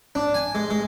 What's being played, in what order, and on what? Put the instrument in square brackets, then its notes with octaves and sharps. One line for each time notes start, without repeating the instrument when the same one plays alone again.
[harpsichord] D4
G#5
G#3
G#3